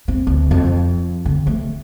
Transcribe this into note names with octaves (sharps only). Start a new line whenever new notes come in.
C4
D2
F2
D3
A3